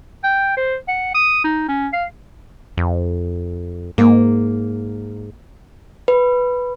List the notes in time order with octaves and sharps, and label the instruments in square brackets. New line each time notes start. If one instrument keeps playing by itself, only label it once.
[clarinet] G5
C5
F#5
D#6
D#4
C#4
F5
[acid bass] F2
[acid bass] G#2 [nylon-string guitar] A#3
[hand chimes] B4